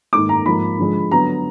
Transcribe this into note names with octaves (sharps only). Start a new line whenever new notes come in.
G#2 D#3 A#3 D6
A#5
G#2 F3 A#3 B5
D3 F3 G#3
D3 F#3 B3 A#5